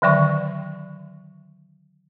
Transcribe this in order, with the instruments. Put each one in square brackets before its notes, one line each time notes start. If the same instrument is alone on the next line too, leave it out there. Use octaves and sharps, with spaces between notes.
[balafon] D3 D#3 F#3 D5 G5 C#6